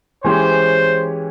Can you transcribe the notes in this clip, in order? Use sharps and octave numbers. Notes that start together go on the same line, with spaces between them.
E3 G#3 C#4 G4 C5 C#5